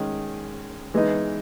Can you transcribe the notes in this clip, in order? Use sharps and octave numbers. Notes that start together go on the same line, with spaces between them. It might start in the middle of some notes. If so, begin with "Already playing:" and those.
Already playing: D#3 G#3 C#4 G#4
E3 G#3 B3 D#4